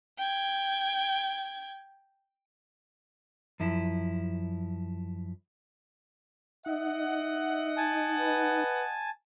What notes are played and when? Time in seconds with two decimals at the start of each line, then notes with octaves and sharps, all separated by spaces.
0.18 G5 G#6
3.60 F#2 F3 E4
6.66 D#4 D#5 E5 F#5
7.77 G#5 A5
8.20 B4